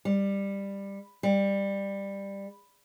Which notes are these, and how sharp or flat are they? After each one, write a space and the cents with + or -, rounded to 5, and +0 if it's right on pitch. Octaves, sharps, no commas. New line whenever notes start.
G3 +15
G3 +15